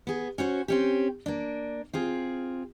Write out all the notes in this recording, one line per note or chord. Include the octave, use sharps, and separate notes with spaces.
B3 G#4
C#4 F#4 C5 C#5
C4 C#4 G4
A#3 D4
C4 F4 G#4